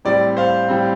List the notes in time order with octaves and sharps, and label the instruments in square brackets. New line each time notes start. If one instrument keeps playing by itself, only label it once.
[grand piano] A2 G3 C4 D5
C5 F5
A2 G3 C4